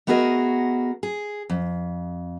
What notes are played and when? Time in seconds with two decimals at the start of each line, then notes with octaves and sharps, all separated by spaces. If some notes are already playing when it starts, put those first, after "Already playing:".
0.07 A3 B3 F#4 G#4 A#4 D#5
1.03 G#4
1.50 F2